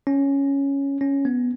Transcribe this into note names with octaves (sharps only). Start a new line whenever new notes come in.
C#4
C#4
B3